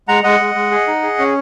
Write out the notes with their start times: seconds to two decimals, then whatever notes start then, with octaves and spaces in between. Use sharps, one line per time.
0.08 G#3 F#5 A#5
0.23 G#3 D#5 F#5
0.40 G#3
0.55 G#3
0.71 G#4
0.87 D#4
1.03 G#4
1.19 C#4